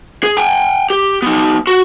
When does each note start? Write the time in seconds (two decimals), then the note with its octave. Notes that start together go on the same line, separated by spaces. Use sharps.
0.23 G#4
0.37 G5 G#5
0.90 G4
1.22 B3 D#4
1.67 F#4